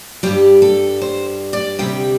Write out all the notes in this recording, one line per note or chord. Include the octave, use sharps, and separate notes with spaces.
G2 G3 G4
A4
C5
D5
D2 C3 G3 G5